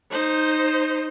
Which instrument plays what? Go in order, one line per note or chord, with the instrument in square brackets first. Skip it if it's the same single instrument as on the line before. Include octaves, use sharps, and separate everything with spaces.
[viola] D#4 C5